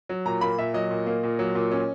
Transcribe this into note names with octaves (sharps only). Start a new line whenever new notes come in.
F#3
A#2 A#5
A#3 B5
A#2 E5
F#3 D#5
A#2
A#3
A#2
F#3
A#2
C#4